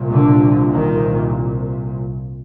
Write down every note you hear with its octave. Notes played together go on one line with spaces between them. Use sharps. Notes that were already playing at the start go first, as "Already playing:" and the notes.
Already playing: C2 A#2
D3
D#3